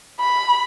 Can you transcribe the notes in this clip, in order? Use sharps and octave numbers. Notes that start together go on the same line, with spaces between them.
B5